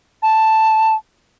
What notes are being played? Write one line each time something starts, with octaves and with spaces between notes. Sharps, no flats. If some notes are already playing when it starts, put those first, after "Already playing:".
A5